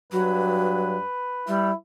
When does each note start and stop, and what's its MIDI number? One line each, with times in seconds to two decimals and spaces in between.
0.12 1.03 43
0.12 0.96 54
0.12 1.76 71
1.48 1.71 55
1.48 1.74 64